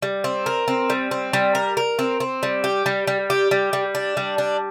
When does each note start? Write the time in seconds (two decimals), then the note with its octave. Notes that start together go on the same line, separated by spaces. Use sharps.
0.02 G3
0.24 C4
0.46 A#4
0.68 C4
0.90 G3
1.11 C4
1.33 G3
1.55 A#4
1.77 A#4
1.99 C4
2.20 C4
2.43 G3
2.64 G4
2.86 G3
3.07 G3
3.30 G4
3.51 G3
3.73 G3
3.95 D4
4.17 G3
4.38 D4